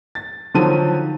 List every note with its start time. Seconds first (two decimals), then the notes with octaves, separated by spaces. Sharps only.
0.15 A6
0.54 D3 D#3 F3 F#3 A5 D#7